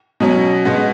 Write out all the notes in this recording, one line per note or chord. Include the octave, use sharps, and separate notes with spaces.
B2 F#3 C#4
B2 G#3 B3